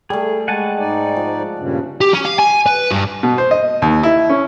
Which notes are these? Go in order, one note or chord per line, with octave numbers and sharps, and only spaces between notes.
G3 A3 G#4
G#3 F#5 G#5 A5
G#2 D#4 D5
F3
G2 A#2 C#3
G4
C#4
F5
G#5
B4
G2
B2
C5
D#5
D#2
E4
C#4